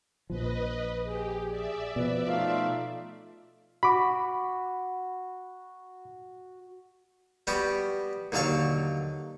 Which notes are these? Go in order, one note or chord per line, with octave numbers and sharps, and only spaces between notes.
A#1 F3 B4 D#5
G4 G#4
D5 E5
B2 F3 B4
A3 D#4 F4 F5
F#4 B5 D6
G3 B3 F#4 G4
D#2 D3 F#3 A4 F5 C#6